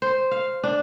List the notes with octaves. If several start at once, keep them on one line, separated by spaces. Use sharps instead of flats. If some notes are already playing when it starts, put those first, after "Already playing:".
C5
F5
D4